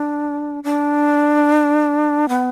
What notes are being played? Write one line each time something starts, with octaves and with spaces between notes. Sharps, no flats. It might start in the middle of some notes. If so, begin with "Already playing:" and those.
Already playing: D4
D4
B3